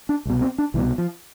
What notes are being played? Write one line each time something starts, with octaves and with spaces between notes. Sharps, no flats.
D4
C2 B2
C4
D4
C2 B2 E3
F3